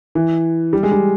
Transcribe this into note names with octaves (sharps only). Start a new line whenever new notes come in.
E3
G3
G#3
G3